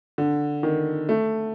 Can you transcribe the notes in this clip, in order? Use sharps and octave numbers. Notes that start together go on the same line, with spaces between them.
D3
D#3
A3